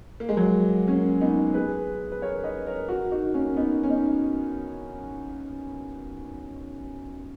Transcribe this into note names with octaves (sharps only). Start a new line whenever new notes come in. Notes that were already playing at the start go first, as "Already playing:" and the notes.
A#3
G#3
F#3 A#3
A#3 C#4
B3 D#4
G#4 B4
B4
A#4 C#5
B4 D#5
A#4 C#5
F#4 A#4
D#4 F#4
A#3 C#4
B3 D#4
C#4
B3 D#4